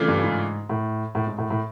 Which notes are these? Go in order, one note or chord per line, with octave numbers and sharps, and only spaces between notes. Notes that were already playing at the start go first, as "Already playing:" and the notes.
Already playing: C#3 E3 A3 D4 F4
G2
G#2
A2
A2
G#2
A2
A2